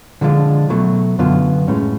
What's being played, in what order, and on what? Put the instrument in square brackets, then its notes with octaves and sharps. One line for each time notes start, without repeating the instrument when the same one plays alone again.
[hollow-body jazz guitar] D3 F3 G#3 D4 F4
B2 F#3 A3
F#2 D3 F#3 B3 F4
A2 G#3 C#4